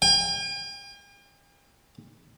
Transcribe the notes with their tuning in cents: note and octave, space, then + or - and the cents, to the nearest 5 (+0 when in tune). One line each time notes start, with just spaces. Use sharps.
G5 +45